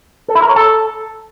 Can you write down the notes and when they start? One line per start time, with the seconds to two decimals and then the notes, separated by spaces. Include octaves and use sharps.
0.28 A4
0.35 E4
0.42 A#4
0.49 C#5
0.56 A4